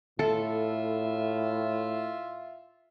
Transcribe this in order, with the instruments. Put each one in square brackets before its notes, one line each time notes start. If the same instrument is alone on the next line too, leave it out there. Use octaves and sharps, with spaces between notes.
[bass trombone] A2 [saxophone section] F4 E5 [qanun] A4